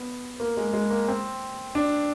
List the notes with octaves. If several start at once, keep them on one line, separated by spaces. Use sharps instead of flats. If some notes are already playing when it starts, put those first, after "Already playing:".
Already playing: B3
A#3
G#3
G#3
A#3
C4
D4